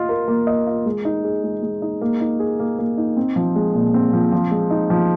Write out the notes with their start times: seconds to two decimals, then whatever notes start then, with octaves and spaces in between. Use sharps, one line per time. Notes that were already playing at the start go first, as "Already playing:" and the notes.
Already playing: F4 D#5
0.09 A#4
0.28 A#3
0.47 D#5
0.67 F4
0.86 G#3
1.05 D#4
1.24 G#4
1.44 G#3
1.62 G#3
1.82 D#4
2.01 A#3
2.20 D#4
2.40 G#4
2.59 A#3
2.79 A#3
2.97 D#4
3.17 C4
3.36 F3
3.56 G#3
3.74 A#2
3.94 C4
4.13 F3
4.32 F3
4.51 G#3
4.70 D#4
4.90 F3